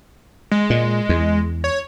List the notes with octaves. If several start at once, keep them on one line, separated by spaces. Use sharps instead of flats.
G#3
A#2
E2
C#5